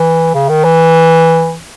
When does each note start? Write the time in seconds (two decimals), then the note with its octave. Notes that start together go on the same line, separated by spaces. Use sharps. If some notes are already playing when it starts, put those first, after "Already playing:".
Already playing: E3
0.35 C#3
0.50 D#3
0.65 E3